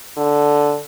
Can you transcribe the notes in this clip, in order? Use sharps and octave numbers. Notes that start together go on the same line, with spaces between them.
D3